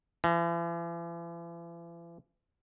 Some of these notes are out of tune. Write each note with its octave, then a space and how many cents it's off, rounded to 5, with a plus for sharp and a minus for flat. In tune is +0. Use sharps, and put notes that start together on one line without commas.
E3 +45